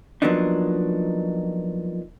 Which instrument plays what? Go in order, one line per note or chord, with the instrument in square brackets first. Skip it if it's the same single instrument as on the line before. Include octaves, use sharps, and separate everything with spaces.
[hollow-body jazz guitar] F3 F#3 A#3 B3 D4 D#4